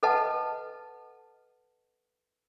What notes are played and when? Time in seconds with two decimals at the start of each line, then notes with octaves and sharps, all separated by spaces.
0.03 A4 B4 D#5 F#5 A5